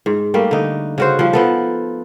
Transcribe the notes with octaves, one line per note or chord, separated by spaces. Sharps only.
G#2
G3 A3 A#3
D3 D#4
C#3 F#4 C5
F3 G3
F3 B3 A4